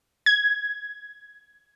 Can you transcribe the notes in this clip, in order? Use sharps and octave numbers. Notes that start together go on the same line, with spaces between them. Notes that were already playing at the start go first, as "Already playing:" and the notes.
G#6